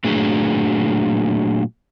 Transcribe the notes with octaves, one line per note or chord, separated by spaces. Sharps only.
A#2 F#3 A3 D4 G#4